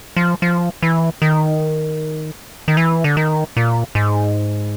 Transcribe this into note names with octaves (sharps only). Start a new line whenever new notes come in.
F3
F3
E3
D#3
D#3
E3
D3
D#3
A#2
G#2